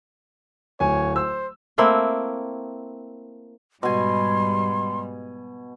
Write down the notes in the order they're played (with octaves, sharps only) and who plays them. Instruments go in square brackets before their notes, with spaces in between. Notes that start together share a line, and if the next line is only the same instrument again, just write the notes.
[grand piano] D1 G#5 [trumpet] C#5
[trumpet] C5 [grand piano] E6
[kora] A3 A#3 C4 E4
[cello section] G#2 G3 [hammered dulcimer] B2 G#5 [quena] C6